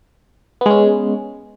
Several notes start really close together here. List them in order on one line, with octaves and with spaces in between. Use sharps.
B3 G#3 C#4